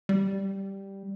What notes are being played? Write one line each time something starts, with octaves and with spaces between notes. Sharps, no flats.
G3